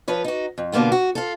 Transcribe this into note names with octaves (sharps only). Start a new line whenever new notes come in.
F3 B4 C#5
D#4 F#4
F2
B2 D3 A#3 B3 F4
F#4
F4 A4